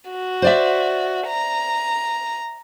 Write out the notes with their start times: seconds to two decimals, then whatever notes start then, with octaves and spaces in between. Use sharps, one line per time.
0.11 F#4
0.42 C5 D5 E5
1.27 A#5